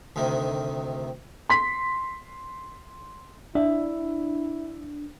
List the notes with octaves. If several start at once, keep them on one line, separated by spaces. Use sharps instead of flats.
D2 C3 D#3
C6 B6
D4 E4 E5